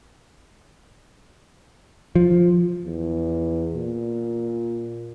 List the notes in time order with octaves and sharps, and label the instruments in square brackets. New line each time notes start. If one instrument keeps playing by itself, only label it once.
[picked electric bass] F3
[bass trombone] E2
A#2